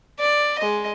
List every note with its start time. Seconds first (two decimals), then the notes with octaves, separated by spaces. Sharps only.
0.19 D5
0.59 G#3 D#5